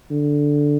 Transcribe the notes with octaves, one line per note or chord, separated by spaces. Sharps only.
D3